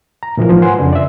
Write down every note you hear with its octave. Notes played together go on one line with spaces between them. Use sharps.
A#5
A#2 E3 F3 A#4
G#2 F3
B4 F#5 G#5 C6
F2 C#3 D4
D5 E5